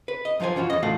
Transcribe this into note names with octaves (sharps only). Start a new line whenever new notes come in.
B4
D#5
F#2 F3 F4 C5 G#5
E3 C#4 F4 F#4
E2 D#5
A#2 E3 A3 F#4 F5